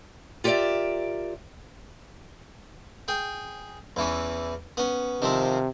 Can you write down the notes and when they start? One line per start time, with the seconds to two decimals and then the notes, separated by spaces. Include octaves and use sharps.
0.44 F4 G4 A#4 C#5 D5 E5
3.08 G#4 G5
3.96 E2 E3 C#4
4.77 B3 C#4
5.22 C3 D#3 F3 C4